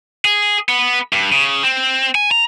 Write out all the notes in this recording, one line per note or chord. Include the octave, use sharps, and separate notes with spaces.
G#4
B3
G2
C#3
C4
G#5
A#5